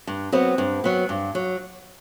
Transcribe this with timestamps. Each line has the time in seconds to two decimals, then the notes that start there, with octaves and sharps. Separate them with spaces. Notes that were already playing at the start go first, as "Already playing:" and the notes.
0.07 G2
0.32 F#3 B3 C4
0.58 G2
0.84 F#3 B3
1.09 G2
1.35 F#3